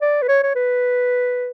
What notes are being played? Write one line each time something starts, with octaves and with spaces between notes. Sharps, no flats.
D5
B4
C#5
C#5
B4